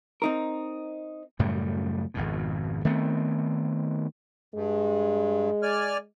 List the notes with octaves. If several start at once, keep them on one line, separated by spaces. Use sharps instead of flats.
C4 D#4 A#4
F#2 A2 C#3 G3
G#1 F2 B2
D#3 A3 B3 C4
G2 G#3
D5 G#5 F6